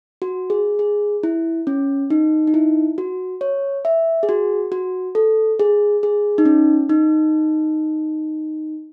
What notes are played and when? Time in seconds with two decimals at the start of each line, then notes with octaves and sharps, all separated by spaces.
0.22 F#4
0.50 G#4
0.79 G#4
1.23 E4
1.67 C#4
2.10 D#4
2.47 D#4
2.54 E4
2.98 F#4
3.41 C#5
3.85 E5
4.23 G#4
4.29 F#4
4.72 F#4
5.15 A4
5.60 G#4
6.03 G#4
6.38 D#4
6.45 C#4
6.89 D#4